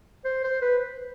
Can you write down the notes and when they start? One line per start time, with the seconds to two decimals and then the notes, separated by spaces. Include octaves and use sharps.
0.25 C5
0.44 C5
0.62 B4